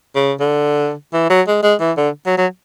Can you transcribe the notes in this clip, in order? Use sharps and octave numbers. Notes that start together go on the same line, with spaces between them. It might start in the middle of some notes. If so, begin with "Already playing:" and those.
C#3
D3
E3
F#3
G#3
G#3
E3
D3
F#3
F#3